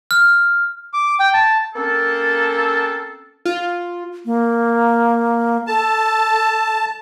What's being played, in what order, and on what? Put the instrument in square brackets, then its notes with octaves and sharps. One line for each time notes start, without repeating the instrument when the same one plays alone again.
[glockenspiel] F6
[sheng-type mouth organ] D6
G5
A5
[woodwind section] A#3 C4 C#4 A4
[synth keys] F4
[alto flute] A#3
[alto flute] A4 [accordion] A5